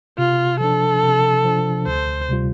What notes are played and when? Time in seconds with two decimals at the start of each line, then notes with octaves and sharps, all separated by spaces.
0.18 C3 F4
0.60 F3 D4 A4
1.03 C3
1.45 F3 D4
1.87 D2 C5
2.29 C3 G3 F4